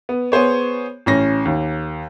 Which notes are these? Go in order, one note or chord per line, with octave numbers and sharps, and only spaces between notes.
B3
B3 G#4 C5 C#5
A1 C#4 A#6
D#2